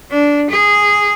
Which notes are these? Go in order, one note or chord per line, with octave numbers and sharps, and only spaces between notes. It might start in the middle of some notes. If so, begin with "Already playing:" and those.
D4
G#4